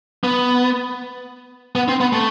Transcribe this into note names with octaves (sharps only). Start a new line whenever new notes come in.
B3
B3
C4
B3
A3